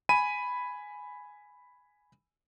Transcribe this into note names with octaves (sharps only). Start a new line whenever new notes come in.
G#5 B5 D#7